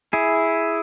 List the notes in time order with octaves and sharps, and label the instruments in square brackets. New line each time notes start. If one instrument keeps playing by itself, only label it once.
[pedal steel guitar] E4 G#4